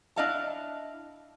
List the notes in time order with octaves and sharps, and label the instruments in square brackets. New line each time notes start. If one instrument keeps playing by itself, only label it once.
[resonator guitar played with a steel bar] D4 E4 D#5 F5 F#5 A5